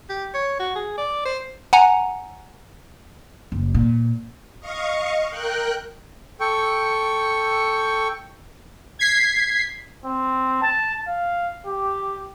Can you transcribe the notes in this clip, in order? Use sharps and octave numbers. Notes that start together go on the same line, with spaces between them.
G4
C#5
F#4
G#4
D5
C5
F#5 G#5 A#5
F#1
A#2
D#5 F5 C#6
A#4 G5 F#6
A4 G5 C#6
G#6 B6 C7
C4
A5
F5
G4